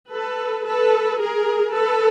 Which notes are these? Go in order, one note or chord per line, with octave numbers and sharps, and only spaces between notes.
A4 B4
A4 B4
G#4 A#4
A4 B4